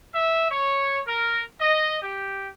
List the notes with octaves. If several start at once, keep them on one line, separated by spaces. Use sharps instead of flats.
E5
C#5
A#4
D#5
G4